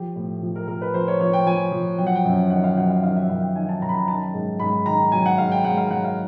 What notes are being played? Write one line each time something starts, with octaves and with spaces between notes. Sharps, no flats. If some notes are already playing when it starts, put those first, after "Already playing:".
Already playing: F3 G4
A2
F3
A#4
F3 A#4
B4
F3 C5
C#5
F3 C#5
G5
F3 G#5
F3
F#3 G5
F#5
G5
F#2
D#3 F#5
F5
F#3 F#5
F5
D#3 F5
E5
F#2 F5
G5
D#3 G#5
A5
F#2 A#5
B5
A#5
D#3 A5
G#2
G#2 B5
D#3 A#5
F#3 G#5
F#5
G#2 F5
G5
G#2 F#5
F5
F#3 F#5
F5